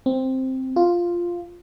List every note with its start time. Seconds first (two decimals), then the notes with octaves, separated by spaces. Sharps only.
0.06 C4
0.76 F4